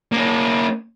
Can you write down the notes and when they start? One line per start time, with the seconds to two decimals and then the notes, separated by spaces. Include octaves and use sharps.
0.12 A#3 C#4